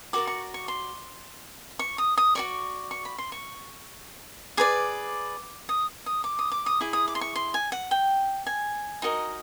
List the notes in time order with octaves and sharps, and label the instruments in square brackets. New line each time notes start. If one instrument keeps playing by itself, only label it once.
[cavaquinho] F#4 A#4 D5 D6
C#6
C#6
C6
C#6
D#6
D#6
F#4 A#4 D5 C#6
C#6
B5
C6
C#6
G#4 B4 D5 D6
D#6
D#6
D6
D#6
D6
D#6
E4 G#4
D#6
D6
C6
C#6
C6
G#5
F#5
G5
G#5
D#4 F#4 A#4 D#5